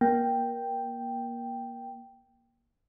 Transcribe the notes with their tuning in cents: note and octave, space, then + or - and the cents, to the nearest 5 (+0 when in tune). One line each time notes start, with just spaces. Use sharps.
A#3 +25 G5 +0